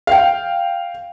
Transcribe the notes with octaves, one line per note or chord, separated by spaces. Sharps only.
F5 G5